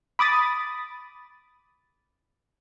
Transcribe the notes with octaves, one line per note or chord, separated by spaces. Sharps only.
B5 D6 D#6 A6